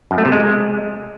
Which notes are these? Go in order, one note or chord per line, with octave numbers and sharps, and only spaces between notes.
F#2
A3
C3
G#3